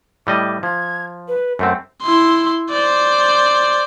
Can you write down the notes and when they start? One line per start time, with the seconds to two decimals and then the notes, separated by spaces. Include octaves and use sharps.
0.27 A2 G3 D#5 D6
0.63 F3 G#6
1.28 B4
1.59 F#2 A3 C4 F#5
2.02 E4 C6
2.71 C5 D5